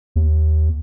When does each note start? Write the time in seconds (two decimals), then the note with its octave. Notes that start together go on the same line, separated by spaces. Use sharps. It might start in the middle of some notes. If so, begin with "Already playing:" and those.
0.16 D#2